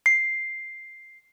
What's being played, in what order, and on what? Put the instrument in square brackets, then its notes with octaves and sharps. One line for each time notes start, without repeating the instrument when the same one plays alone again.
[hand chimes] C7